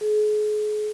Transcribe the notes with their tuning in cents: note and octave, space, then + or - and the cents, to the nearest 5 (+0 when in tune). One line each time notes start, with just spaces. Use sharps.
G#4 +35